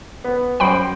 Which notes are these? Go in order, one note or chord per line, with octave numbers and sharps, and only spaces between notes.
B3
F#2 C5 G5 B5 C#6